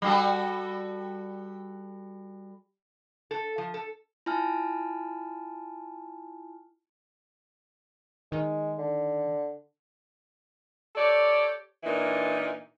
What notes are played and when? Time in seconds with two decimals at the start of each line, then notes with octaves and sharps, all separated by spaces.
0.02 G3 F#4 A4
3.31 A4
3.58 F3
3.74 A4
4.26 E4 F4 G#5 A5 F6
8.32 D#3 G#3
8.79 D3
10.96 G4 A4 C#5 D5
11.84 A#2 E3 A#3 D4 D#4